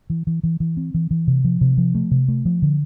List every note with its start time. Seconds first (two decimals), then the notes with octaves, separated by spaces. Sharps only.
0.10 E3
0.27 E3
0.43 E3
0.60 E3
0.77 C4
0.94 E3
1.11 E3
1.27 C3
1.44 F3
1.61 C3
1.78 F3
1.95 A3
2.11 C3
2.28 A3
2.45 F3
2.62 D3